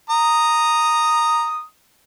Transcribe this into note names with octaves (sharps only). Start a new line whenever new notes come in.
A#5 D#6